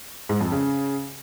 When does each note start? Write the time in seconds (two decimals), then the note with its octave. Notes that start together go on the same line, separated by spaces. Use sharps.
0.29 G#2
0.41 F2
0.52 C#3